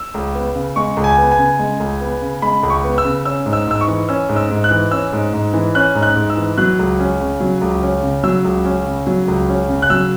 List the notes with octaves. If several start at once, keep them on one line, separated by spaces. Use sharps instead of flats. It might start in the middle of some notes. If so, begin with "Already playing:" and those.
Already playing: E6
C#2
B3
C#3
G#3 C#6
C#2
G#5
B3
G#5
C#3
G#3
C#2
B3
C#3
G#3 B5
C#2
C#6
B3
E6
C#3
C#4 E6
G#2
E6
G#2 E6
C#6
E3
C#4 E6
G#2
E6
G#2
F#6
E3
C#4 E6
G#2
G#2
E3
C#4 F#6
G#2
F#6
G#2
E6
E3
F#3 F#6
C#2
C#4
C#3
F#3
C#2
C#4
C#3
F#3 E6
C#2
C#4
C#3
F#3
C#2
C#4
C#3
F#6
F#3 E6